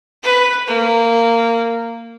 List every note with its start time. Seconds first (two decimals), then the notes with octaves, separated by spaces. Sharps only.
0.23 B4
0.67 A#3